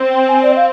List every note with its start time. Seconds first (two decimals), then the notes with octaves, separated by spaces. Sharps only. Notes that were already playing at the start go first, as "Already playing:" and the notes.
Already playing: C4
0.10 G5
0.28 G#5
0.42 D5
0.50 D#5
0.57 F5